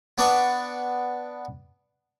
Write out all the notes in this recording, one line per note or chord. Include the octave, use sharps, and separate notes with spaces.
B3 D4 D5 A5 C#6